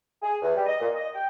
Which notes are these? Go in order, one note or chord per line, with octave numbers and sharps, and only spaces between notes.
G#4
E2
G3
D#5
A#2
D#5
G5